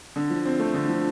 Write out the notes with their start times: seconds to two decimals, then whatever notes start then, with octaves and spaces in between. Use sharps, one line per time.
0.16 D3
0.30 F3
0.45 C4
0.59 A3
0.74 D3
0.89 F3